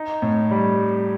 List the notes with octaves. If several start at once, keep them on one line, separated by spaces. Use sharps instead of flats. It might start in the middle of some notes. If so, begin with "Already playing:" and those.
Already playing: D#4
A2
G3